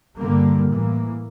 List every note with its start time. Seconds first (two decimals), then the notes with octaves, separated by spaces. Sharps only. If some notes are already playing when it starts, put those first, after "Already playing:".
0.19 G2 D3 G3 A#3
0.70 A2 E3 A#3